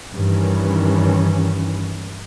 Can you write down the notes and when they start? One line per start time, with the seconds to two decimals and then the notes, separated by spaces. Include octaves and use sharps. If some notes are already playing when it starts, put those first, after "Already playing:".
0.12 G2 D#3 E3 C#4